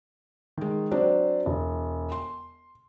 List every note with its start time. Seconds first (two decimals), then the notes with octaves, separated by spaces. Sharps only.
0.58 D#3 G#3
0.91 F#3 C4 D4
1.46 E1
2.12 C6